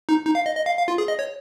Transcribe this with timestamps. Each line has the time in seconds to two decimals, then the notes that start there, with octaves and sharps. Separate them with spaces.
0.09 D#4
0.25 D#4
0.35 F5
0.46 D#5
0.56 D#5
0.66 F5
0.78 F5
0.88 F4
0.98 G#4
1.08 D#5
1.19 C#5